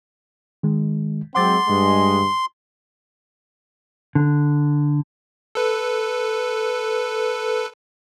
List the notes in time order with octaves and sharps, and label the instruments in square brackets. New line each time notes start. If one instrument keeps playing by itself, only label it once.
[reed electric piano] D#3 G#3
[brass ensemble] F#3 G#3 C4 [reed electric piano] F#5 D6 A6 [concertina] C6
[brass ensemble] G2 G#3
[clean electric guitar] D3
[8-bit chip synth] A4 B4